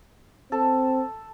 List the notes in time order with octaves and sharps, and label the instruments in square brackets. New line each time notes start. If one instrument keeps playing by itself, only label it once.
[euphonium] C4 [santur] A4